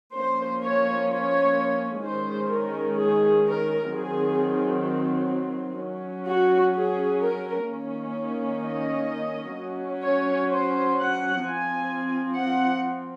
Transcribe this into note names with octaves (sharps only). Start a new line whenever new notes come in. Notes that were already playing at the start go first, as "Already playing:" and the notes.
F3 A#3 C#4 C5
C#5
C#5
D#3 G#3 C#4 C5
A#4
G#4
A#4
D#3 F#3 C4 G#4
F#3 C#4
F#4
G#4
A#4
D#3 A#3 C#4
D#5
F#3 C#4
C#5
C5
F#5
F3 C4 G#5
F#5